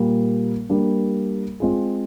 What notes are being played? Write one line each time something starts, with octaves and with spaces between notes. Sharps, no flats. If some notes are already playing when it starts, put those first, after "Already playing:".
Already playing: A#2 G3 A#3
G3 A#3 D4
G#3 C4 F4 G#4